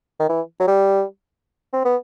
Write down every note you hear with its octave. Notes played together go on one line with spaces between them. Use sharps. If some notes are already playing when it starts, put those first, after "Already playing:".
D#3
E3
F#3
G3
C4
B3